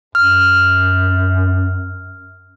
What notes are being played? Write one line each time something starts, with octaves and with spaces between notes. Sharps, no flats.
F#2 F6